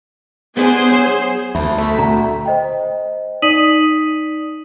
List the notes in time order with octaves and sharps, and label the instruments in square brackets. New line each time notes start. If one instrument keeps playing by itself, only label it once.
[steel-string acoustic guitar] B3 D4 G#5 [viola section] G#4 C5
[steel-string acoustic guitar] F#3
[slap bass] D2 [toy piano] E5 B5
[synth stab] A3 B6
[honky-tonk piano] D2 [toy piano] A#5
[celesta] C5 D#5 G5
D#4 D5 D#6 B6 D#7 F#7